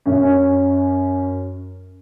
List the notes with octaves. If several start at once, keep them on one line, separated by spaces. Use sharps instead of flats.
F#2 C#4